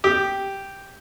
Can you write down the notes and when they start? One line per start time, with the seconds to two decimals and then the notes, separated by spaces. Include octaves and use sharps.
0.04 G4